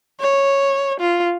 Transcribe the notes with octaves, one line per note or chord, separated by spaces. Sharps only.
C#5
F4